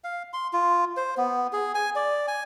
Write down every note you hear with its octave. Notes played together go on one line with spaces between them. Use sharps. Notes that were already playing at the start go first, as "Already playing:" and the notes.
F5
C6
F4
C5
B3
G#4
G#5
D5
G#5